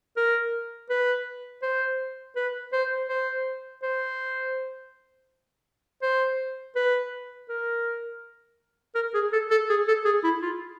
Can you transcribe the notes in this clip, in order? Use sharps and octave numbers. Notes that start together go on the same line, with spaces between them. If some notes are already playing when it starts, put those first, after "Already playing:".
A#4
B4
C5
B4
C5
C5
C5
C5
B4
A#4
A#4
G#4
A4
A4
G#4
A4
G#4
E4
F4